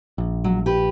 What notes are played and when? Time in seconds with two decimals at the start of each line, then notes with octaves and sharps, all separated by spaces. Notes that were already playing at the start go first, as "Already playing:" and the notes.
0.18 A#1
0.44 F#3
0.66 G4 B4